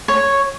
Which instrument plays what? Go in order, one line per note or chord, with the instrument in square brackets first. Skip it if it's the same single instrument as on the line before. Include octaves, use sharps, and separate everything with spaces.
[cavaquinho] C#5